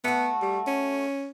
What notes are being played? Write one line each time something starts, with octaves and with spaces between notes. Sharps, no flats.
A3 B3 F#4
G3
C#4